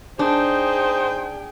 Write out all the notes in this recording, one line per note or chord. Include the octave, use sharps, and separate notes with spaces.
D4 D#4 G#4 C5 G5